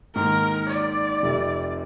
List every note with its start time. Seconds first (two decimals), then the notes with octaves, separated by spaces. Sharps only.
0.15 G#2 D#3 A#3 D#4 A#4
0.69 D5
1.23 F1 F2 C3